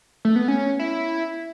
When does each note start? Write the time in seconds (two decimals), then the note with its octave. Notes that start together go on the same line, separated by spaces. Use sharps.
0.25 A3
0.36 B3
0.48 C#4
0.79 E4